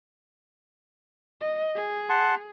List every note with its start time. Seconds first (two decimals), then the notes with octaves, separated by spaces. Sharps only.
1.41 D#5
1.75 G#4
2.09 F#5 A5 C6